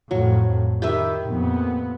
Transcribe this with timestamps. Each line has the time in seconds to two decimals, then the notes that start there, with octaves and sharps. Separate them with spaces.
0.11 F2 A2 F#3
0.82 D#3 G4 B4 E5
1.26 F2 A#2 B3